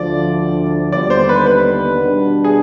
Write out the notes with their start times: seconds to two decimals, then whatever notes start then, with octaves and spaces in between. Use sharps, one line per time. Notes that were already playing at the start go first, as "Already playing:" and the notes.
Already playing: D2 D3 F3 D5
0.92 D#2 D3 G3 B3 D5
1.10 C5
1.29 B4
1.47 B4
2.02 B2 G3 D4
2.44 G#4